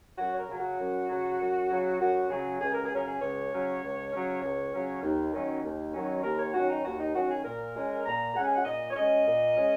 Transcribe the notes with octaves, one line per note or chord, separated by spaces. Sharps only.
F#2 F#4
C#5
A#4
C#3 F#3
F#4
F#2
C#3 F#3
F#2
C#3 F#3
F#2 F#4
C#3 F#3 G#4
C#2 G#4
A#4
G#4
C#3 F#3 C#4 A#4
G#4
C#2 C#5
C#3 F#3 C#4
C#2
C#3 F#3 C#4
C#2 C#5
C#3 F#3 C#4
D#2
D#3 F#3 C#4
D#2
D#3 F#3 C#4
D#2 A#4
C#5
D#3 F#3 C#4 F#4
D#4
D#2 F#4
D#4
D#3 F#3 C#4 F#4
G#4
A#2 A#4
G#3 C#4
A#2 A#5
G#3 C#4 F#5
G#5
F#5
A#2 D#5
C#5
G#3 C#4 D#5
A#2
G#3 C#4